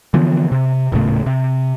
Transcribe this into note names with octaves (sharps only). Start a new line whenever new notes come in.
D3 E3 F3 B3
C3
D#1 A2 C#3 A3
C3